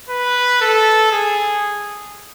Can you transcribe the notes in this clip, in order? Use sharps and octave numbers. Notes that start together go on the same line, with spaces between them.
B4
A4
G#4